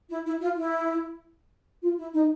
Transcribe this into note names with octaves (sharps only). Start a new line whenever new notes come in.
E4
E4
F4
E4
F4
E4
D#4